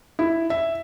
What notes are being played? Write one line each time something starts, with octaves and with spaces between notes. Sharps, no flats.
E4
E5